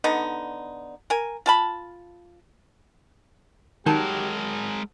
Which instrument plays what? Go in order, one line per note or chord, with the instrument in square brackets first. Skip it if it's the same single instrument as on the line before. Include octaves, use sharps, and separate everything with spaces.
[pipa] D3 B3 D#4
A#4 G#5
F4 A5 B5
[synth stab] D#3 [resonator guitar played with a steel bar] F#3 A5 [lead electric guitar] G#3 A#4 [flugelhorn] G4
[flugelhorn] G#4